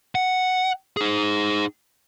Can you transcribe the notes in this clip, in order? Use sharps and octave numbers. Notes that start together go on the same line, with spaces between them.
F#5
D#4 G#4